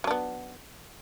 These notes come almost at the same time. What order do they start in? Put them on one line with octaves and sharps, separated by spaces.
F#3 D4 B3